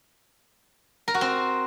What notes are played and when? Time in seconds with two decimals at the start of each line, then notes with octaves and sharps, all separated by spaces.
1.08 A#4
1.14 F#4
1.21 C4